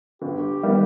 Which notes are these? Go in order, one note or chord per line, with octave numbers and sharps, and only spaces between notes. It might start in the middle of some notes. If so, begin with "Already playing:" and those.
G1 G4
D#3 G3 B3